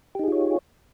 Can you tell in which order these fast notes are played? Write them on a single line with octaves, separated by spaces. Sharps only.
G4 D#4 G#4 F4 C#5